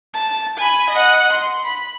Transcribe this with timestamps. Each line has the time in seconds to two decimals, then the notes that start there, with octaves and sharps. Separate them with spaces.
0.14 A5
0.57 G#5 B5
0.90 D#5 F#5
1.32 C6
1.64 B5